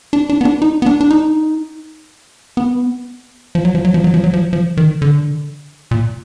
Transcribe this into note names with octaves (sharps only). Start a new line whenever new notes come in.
D4
D4
B3
D4
D#4
B3
D4
D4
D#4
B3
F3
F#3
F3
F#3
F3
F#3
F3
F#3
F3
F3
D#3
D3
A#2